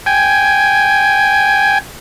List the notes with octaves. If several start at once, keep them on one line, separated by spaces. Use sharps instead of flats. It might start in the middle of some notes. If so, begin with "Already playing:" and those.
G5 G#5